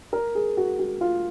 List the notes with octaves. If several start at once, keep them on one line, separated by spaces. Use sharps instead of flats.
A#4
G#4
F#4
F#4
F4